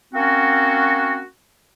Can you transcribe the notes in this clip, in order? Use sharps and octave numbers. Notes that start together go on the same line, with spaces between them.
A#3 C4 C#4 F#4